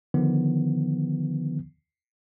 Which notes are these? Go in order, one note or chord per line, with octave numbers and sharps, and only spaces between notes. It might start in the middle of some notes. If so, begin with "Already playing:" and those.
D3 D#3 F3 B3